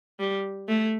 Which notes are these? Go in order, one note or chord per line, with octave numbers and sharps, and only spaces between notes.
G3
A3